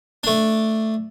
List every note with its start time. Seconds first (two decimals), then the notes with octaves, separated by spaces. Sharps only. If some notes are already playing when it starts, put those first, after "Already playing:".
0.24 A3 D4